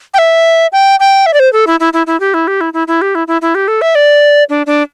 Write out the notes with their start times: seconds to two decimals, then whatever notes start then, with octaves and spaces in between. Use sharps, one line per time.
0.14 G5
0.18 E5
0.72 G5
1.00 G5
1.26 E5
1.34 D5
1.39 C5
1.53 A4
1.67 E4
1.80 E4
1.93 E4
2.07 E4
2.20 G4
2.34 E4
2.47 G4
2.61 E4
2.73 E4
2.88 E4
3.02 G4
3.15 E4
3.28 E4
3.42 E4
3.55 G4
3.68 A4
3.81 E5
3.95 D5
4.49 D4
4.66 D4